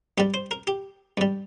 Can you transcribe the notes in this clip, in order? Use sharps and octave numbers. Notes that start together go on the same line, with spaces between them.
G2 G3 G4
C5
A#4
G4
G2 G3